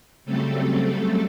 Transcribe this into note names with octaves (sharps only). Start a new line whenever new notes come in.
C#3 F#3 G3 A3 C4 A4